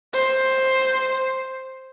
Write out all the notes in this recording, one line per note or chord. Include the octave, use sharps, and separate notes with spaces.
C5